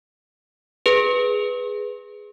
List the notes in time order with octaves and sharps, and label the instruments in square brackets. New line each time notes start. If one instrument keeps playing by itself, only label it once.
[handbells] G#4 B4